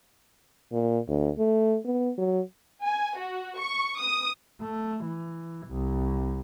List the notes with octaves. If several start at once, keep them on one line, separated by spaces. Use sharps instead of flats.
A#2
D2
A3
B3
F#3
G#5
F#4
C#6
D#6
A3
E3
C2